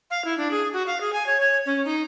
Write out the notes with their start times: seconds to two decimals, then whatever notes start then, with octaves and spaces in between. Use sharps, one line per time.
0.11 F5
0.25 E4
0.38 D4
0.51 G#4
0.73 F#4
0.87 F5
1.01 G#4
1.13 G#5
1.27 C#5
1.40 C#5
1.66 C#4
1.85 D#4